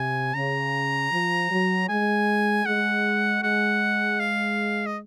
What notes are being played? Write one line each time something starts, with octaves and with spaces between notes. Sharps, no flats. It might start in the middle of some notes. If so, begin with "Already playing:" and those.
Already playing: C3 G#5
C#3 A#5
F3
F#3
G#3 G#5
G#3 F#5
G#3 F#5
F5
D#5